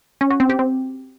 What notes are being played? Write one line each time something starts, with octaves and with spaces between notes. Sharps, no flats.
C#4
F#4
C4
G4
C4